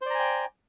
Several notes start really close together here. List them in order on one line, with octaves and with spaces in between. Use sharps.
C5 D5 A#5 G#5 G5